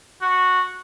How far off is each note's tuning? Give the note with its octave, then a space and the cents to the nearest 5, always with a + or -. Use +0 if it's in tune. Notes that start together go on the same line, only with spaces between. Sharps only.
F#4 -10